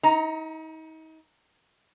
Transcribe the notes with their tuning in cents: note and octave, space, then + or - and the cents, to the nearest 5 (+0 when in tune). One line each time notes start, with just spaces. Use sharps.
D#4 +35 A#5 +0